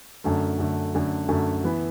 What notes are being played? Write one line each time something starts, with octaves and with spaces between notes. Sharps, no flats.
F#2 D3 A3
F#2 D3 A3
F#2 D3 A3
F#2 D3 A3
E3 B3 E4 B4